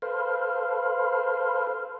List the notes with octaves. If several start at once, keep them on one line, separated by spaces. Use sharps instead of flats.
A4 B4 C5 F5